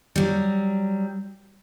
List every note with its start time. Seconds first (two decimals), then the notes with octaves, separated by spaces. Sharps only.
0.16 F#3 G3